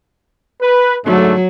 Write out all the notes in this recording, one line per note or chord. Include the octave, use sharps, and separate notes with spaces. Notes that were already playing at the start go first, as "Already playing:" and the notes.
B4
G#2 D3 F#3 A3